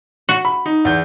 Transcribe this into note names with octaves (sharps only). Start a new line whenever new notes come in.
F#4
B5
D#4
E2 G6